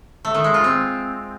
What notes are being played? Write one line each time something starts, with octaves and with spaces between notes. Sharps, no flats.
A3
D#3
G#3
F4
C4